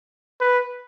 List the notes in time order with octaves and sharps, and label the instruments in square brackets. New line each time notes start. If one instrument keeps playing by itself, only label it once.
[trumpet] B4